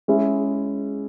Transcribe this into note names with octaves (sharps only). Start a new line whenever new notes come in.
G#3 C#4 E4 G#4